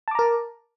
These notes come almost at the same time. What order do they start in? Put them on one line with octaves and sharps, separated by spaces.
A5 D6 A#5 A#4